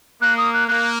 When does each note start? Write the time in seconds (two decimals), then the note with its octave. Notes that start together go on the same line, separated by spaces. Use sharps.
0.21 A#3 F#6
0.38 D#6
0.54 F#6
0.68 A#3 F#6